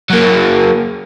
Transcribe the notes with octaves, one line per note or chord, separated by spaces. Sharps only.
F#3 A#3